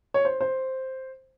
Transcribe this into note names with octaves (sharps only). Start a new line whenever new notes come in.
C#5
C5
C5